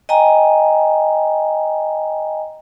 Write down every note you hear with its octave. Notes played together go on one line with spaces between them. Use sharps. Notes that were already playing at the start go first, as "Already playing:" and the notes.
D#5 G5 G#5 A#5